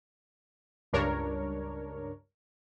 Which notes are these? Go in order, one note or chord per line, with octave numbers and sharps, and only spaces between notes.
C#2 G2 D4 A#4 C#5